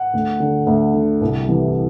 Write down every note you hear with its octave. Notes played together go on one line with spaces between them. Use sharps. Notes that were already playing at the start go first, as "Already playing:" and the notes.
Already playing: F#5
D2
D3
D2
D3
C2
C3 E3